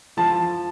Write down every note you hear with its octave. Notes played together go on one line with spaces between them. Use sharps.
F3 A5